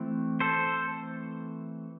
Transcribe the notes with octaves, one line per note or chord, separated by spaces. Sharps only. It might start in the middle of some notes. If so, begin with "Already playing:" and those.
Already playing: E3 A3 C4
A4 C5